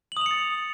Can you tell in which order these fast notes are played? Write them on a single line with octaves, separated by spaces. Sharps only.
F#7 D#6 F7 C#7 A6